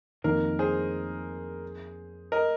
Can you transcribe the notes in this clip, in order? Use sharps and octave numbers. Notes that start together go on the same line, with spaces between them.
F2 D#3 A#3 A#4
G#4 C5
A#4 D#5